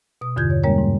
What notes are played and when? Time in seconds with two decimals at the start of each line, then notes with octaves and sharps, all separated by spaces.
0.21 B2 D#6
0.36 E2 G2 D3 F4 G6 G#6
0.50 C#5
0.64 G3 G#3 A#3 C#4 A#4 C#5
0.78 G#2